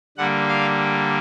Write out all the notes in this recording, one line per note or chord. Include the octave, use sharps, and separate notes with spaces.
D3 G3 A#3 F#5
F5